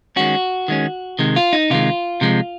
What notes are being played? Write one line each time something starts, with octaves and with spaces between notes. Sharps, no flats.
D#3 G#3 C#4 F#4
D#3 G#3 C#4
C3 D#3 G#3
F4
D#4
C3 D#3 G#3 F4
C3 F3 G#3